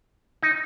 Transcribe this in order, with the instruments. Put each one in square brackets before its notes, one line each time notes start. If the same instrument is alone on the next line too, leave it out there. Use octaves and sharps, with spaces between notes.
[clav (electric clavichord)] D#4